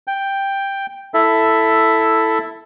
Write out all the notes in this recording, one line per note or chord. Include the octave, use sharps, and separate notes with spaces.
G5
E4 A4 E5